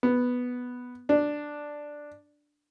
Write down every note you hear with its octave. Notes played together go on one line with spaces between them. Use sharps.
B3
D4